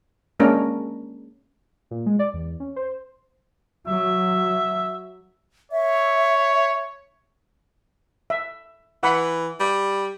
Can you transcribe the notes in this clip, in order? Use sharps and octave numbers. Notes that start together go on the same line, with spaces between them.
G#3 A#3 C#4 D4 A#4
A#2
G#3
D5
E2
C#4
C5
F#3 E5
C#5 E5
E5
E3 F#5 B5
G3